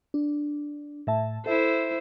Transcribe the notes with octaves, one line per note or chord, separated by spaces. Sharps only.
D4
A2 E5 A5
E4 A4 C5 E5